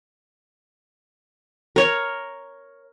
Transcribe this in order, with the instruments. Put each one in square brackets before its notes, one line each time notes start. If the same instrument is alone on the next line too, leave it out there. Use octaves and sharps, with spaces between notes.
[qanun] A#4 C#5